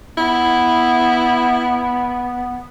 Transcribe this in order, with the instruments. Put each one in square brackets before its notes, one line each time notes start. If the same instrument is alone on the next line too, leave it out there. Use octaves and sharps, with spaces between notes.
[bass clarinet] B3 [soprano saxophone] E4